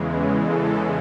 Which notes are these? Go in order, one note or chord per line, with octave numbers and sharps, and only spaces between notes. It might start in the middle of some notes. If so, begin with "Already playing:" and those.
Already playing: E2 C#3 E3 G#3
A4